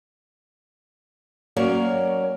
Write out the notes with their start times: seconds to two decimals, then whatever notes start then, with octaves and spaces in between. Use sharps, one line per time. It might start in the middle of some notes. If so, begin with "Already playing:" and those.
1.57 F#3 A#3 C#4 A#4 D5